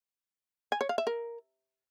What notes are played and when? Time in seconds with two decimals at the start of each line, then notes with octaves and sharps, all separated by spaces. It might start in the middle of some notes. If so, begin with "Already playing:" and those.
0.72 G#5
0.81 C#5
0.89 F5
0.98 E5
1.07 A#4